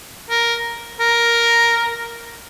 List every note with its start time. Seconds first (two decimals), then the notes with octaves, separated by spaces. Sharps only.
0.30 A#4
1.00 A#4